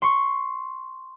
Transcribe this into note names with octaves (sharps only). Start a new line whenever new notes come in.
C6 C#6